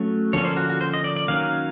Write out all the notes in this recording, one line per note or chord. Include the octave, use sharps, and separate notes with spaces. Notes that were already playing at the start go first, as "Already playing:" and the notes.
Already playing: F#3 A3 C#4
D3 F3 A#3 C#4 C#5
C5
F#4
F#4
C5
D#5
D5
D5
D#3 F#3 A#3 C#4 F5